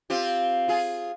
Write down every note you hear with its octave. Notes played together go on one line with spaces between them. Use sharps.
C4 F4 G4
F4 G#4